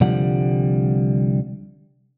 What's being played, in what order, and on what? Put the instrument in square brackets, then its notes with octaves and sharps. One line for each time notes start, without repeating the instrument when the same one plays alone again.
[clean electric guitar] C2 D3 F3 G3 G4 F#5